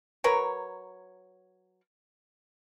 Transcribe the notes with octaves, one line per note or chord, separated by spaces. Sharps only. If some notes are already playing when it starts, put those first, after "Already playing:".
F#3 A#4 B4 C#5